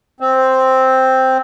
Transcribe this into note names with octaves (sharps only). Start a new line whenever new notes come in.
C4